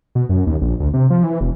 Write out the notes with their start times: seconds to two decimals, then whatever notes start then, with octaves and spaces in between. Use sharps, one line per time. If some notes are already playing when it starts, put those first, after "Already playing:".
0.15 B2
0.29 F#2
0.47 D#2
0.62 A#1
0.80 D2
0.93 C3
1.10 F3
1.24 E3
1.41 E1